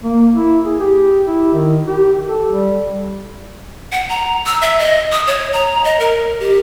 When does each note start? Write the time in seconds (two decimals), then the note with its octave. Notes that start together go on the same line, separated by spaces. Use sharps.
0.04 A#3
0.34 E4
0.65 G#4
0.80 G4
1.27 E4
1.54 D#3
1.87 G4
2.28 A4
2.50 G3
3.92 F#5
4.09 A#5
4.46 E6
4.61 E5
4.79 D#5
5.12 D#6
5.27 C#5
5.53 A#5
5.84 D#5
6.00 A#4
6.40 G4